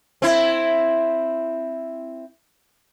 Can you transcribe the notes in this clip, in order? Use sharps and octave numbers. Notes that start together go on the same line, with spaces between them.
C4 E4